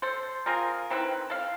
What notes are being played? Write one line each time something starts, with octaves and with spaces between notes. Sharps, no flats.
A4 C5
C4 F4 G#4 A#4
D#3 C4 E4 B4
A4 F5